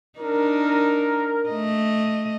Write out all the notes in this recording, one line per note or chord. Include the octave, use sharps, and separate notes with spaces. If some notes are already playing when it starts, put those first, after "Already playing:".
D4 D#4 A#4
A3 D#5